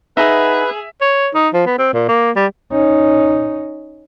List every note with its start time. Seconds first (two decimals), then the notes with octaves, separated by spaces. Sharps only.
0.17 D#4 G#4 B4 E5 F#5
1.01 C#5
1.35 D#4
1.54 F3
1.67 B3
1.79 C4
1.94 A#2
2.09 A#3
2.36 G3
2.72 C#4 D#4